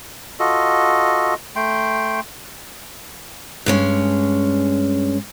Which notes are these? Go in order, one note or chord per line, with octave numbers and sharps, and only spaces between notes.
F4 F#4 A4 D#5
A3 G5 C6
G2 G#3 C#4